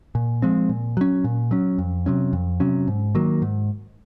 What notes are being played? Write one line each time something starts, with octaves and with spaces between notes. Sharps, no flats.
A#2
F3 G#3 C4
A#2
F#3 C#4
A#2
F#3 C#4
F2
C3 F#3 C#4
F2
C3 F#3 C#4
G#2
D#3 F#3 A#3
G#2